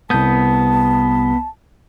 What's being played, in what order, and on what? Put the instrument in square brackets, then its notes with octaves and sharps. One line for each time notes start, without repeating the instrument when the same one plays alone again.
[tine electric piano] C2 D#6 [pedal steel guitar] B3 G6 [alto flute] A5